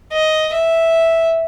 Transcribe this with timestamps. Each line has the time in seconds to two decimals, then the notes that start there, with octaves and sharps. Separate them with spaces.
0.13 D#5
0.53 E5